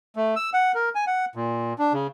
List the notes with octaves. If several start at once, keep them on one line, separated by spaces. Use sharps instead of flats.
A3
E6
F#5
A#4
G#5
F#5
A#2
D4
C#3